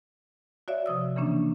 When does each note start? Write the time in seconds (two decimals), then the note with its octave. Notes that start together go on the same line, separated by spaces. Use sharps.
0.68 F#4 C#5 D5 E5 F5
0.86 C3 F3 D#6 E6
1.16 C#3 E3 A#3 C#4 D4